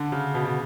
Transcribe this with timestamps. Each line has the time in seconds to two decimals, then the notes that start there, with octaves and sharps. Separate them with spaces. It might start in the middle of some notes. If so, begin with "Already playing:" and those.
Already playing: D3
0.12 C#3
0.34 B2
0.45 B2